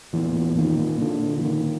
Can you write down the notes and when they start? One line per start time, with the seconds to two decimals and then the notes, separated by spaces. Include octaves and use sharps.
0.13 E2 A#2 E3
0.35 A#2
0.56 A#2 D#3
0.79 A#2
1.01 A#2 D3
1.22 A#2
1.39 E3
1.44 A#2 D#3